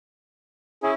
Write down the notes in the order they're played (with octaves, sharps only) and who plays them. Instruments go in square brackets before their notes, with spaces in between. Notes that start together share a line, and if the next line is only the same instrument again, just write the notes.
[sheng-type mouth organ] C#4 E4 [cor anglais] G#4